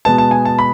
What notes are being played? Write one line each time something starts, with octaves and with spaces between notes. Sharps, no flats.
B2 G#3 B3 A5
A5
G#5
A5
B5